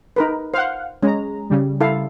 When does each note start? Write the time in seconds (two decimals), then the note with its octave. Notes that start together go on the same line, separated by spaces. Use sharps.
0.16 D#4 A#4 B4
0.54 C5 F5 F#5
1.03 G#3 C#4 A#5
1.50 C#3 G3
1.81 E4 A4 F5